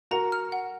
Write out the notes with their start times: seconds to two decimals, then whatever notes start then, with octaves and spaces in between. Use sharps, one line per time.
0.11 F#4 A#4 A#5
0.32 F6
0.52 F#5